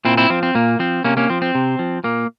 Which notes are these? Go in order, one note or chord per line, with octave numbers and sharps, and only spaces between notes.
A#2 C4 E4
C4 E4
F3 C4
C4
A#2 A#3
F3 C4
C3 A#3 C#4
A#3 C#4
F3 C4
C4
C3
F3
A#2 A#3